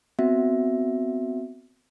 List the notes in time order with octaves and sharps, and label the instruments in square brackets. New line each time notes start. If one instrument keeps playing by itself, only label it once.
[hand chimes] B3 C4 F#4 E5